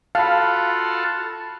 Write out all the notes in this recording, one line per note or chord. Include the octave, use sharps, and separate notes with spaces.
F4 F#4 A4 F5 A5 B5